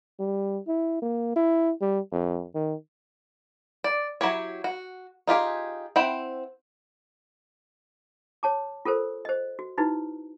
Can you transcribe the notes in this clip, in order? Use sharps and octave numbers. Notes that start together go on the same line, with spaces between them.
G3
E4
A#3
E4
G3
F2
D#3
D5
F#3 E4 G4 C#5
F#4
D#4 F4 G4 G#4
C4 E4 F#5 G5
C#5 A5 D6
F4 A4 A#4 C5
C5 D#5
F#4
D#4 E4 F#4 B4